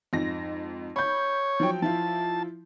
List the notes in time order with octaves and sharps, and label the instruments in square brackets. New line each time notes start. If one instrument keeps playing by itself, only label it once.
[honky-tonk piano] F2 G#2 A#6
[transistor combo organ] C#5 [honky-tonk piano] B5 G6
[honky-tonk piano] F3 F#3 G5
[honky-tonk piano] F3 E4 F4 [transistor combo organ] A5